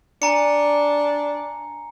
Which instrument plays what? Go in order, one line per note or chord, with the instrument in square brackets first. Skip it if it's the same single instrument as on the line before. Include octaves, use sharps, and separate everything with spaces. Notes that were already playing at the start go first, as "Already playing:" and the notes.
[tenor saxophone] D4 [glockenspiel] G#5 A#5 C#7